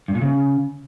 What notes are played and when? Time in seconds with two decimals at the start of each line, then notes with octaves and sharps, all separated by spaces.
0.08 G2
0.15 A#2
0.22 C#3